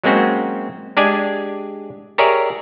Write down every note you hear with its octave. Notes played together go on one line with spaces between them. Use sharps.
F#3 G#3 A#3 C4 C#4 F#4
G#3 D4 G4 G#4 D5 G#5
G4 G#4 A#4 C#5 D5 E5